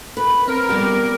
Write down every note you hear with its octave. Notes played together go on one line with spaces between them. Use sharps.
B4
C4 A#4
G3 B3 G4 D5